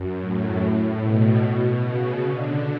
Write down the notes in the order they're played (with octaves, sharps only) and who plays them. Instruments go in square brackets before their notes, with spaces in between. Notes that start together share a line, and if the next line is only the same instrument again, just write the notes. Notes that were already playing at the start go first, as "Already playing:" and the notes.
Already playing: [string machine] F#2
A2
B2
B2
C#3
D3